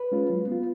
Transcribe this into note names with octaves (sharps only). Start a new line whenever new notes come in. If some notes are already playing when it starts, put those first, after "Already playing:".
Already playing: B4
G#3 C#4 F4
F#3
B3 F4